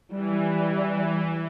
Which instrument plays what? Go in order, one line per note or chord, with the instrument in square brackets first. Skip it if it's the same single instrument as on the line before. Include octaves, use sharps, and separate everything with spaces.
[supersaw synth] E3 [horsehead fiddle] G3